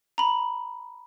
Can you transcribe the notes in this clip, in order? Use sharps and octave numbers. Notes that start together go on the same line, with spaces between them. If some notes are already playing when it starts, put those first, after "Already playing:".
A#5 B5